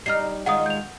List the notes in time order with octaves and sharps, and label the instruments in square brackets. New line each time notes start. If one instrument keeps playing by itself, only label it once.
[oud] G3 D#4 [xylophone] F6 C7
[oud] D#3 G#3 F4 [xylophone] F#5 D#6
[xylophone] G6 F7